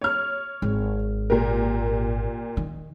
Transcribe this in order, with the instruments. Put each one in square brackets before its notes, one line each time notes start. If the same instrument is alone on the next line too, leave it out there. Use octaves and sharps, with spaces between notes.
[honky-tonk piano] C#5 F6
[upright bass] G#1
[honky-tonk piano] A#2 G4 A#4
[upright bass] D#3